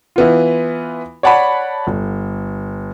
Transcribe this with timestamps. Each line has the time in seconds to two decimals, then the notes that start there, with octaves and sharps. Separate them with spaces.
0.16 E3 B3 F4
1.23 C#5 D5 F#5 A5 B5
1.87 G1